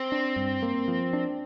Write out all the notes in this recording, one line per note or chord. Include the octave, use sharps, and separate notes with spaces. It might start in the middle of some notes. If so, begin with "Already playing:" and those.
Already playing: C4
D4
G2
A#3
F3
D4